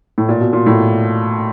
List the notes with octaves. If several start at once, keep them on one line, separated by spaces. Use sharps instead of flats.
A2
A#2
B2
A#2
A2